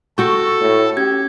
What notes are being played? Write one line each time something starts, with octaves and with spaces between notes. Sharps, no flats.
F#4 A4 G5 C#6
A2
C#4 G4 G#6